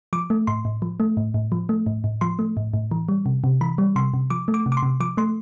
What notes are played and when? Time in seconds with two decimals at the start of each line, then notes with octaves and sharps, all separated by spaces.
0.13 F3 D6
0.30 A3
0.47 A2 C6
0.65 A2
0.82 F3
1.00 A3
1.17 A2
1.34 A2
1.52 F3
1.69 A3
1.86 A2
2.04 A2
2.21 F3 C6
2.39 A3
2.57 A2
2.74 A2
2.91 E3
3.09 G3
3.26 C3
3.44 C3
3.61 E3 B5
3.78 G3
3.96 C3 C6
4.14 C3
4.30 F3 D6
4.48 A3
4.54 D6
4.66 C3
4.72 D6
4.77 C6
4.83 C3
5.00 F3 D6
5.17 A3 C6